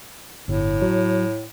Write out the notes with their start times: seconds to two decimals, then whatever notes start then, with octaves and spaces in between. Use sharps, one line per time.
0.48 G1 A2
0.82 F#3